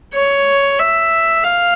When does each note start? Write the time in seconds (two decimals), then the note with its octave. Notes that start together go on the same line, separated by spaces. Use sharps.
0.14 C#5
0.79 E5
1.44 F5